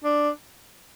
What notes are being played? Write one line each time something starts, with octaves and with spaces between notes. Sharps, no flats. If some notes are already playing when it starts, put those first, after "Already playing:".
D4